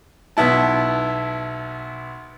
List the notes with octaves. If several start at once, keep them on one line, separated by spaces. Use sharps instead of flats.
B1 B3 E4 A5